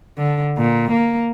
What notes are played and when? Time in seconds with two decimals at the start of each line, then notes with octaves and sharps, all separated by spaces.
0.18 D3
0.58 A#2
0.92 A#3